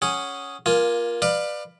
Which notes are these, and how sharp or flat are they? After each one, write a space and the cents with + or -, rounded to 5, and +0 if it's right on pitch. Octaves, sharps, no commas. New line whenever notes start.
C#4 +0 G#4 +0 F#5 +0
A#3 +20 F4 +0 G#5 +0
B4 +0 D5 +25 F5 +0